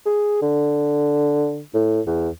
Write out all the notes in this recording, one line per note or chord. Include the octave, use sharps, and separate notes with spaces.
G#4
D3
A2
E2